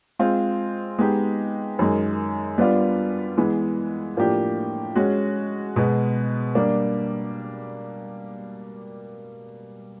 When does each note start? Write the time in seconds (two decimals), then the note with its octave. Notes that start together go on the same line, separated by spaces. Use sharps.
0.19 G#3 C4 F4
0.99 G#3 B3 D#4 G4
1.79 F#2 D#3 G#3
2.58 G3 B3 D4 F4
3.38 E3 G#3 B3
4.17 A2 F3 A#3 D4 G4
4.95 G#3 C#4 F#4
5.76 B2 G#3 B3
6.55 G3 A#3 D4